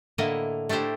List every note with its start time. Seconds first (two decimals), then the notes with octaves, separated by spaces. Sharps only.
0.18 A2 D3 A#3 E4 D#5
0.69 A3 D4 E4 G4 C5